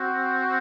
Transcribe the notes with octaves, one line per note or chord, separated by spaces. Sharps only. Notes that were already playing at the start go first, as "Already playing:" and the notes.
Already playing: C4 F#4